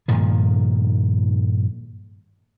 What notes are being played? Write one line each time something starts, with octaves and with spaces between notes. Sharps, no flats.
G2 A#2 D#3 F3